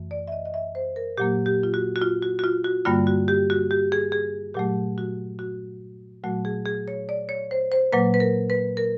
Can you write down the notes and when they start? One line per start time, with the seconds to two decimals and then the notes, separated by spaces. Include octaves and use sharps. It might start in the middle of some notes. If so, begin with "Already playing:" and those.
Already playing: F#2 E3 A3
0.11 D5
0.28 E5
0.32 D#5
0.46 D#5
0.54 E5
0.75 C5
0.96 A#4
1.18 A#2 F#3 A#3 G4
1.46 G4
1.63 F4
1.74 F#4
1.96 F#4
2.02 F4
2.22 F#4
2.39 F#4
2.44 F4
2.64 F#4
2.85 G2 D3 G3 A#3 F4
3.07 F#4
3.28 G4
3.50 F#4
3.71 G4
3.92 G#4
4.12 G#4
4.54 A#2 F#3 A3 G4
4.98 F#4
5.39 F#4
6.24 A#2 F#3 A3 F#4
6.45 G#4
6.65 G#4
6.88 C#5
7.09 D5
7.29 C#5
7.51 C5
7.72 C5
7.92 A#2 F#3 A#3 B4
8.14 B4
8.20 A#4
8.50 B4
8.77 A#4